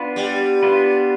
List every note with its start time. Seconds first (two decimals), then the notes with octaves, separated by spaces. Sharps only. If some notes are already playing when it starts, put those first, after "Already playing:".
Already playing: B3 D4 F4 B4
0.16 G3
0.63 B3 D4 F4 B4